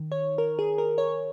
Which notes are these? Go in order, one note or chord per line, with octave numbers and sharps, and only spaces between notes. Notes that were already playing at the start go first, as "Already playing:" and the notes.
Already playing: D#3
C#5
A#4
G#4
A#4
C#5